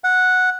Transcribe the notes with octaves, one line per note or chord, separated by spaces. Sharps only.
F#5